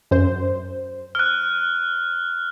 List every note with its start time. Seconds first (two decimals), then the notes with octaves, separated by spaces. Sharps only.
0.11 F#2 C5
1.15 F6 F#6